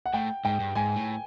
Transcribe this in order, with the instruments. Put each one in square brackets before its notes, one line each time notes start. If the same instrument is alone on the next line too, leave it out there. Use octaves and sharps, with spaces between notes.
[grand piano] F#5
[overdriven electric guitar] A2 [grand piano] G5
[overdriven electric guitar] G#2 [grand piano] G5
[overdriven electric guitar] G2
[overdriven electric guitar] G#2 [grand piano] G#5
[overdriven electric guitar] A2